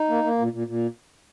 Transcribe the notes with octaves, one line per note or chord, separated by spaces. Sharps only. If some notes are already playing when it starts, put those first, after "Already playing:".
Already playing: D#4
A#3
A#3
A#2
A#2
A#2